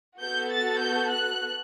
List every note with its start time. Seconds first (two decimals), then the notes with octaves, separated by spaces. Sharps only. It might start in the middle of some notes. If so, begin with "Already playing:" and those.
0.21 B3 F#4 A4 G6
0.51 A6
0.81 G6
1.11 F#6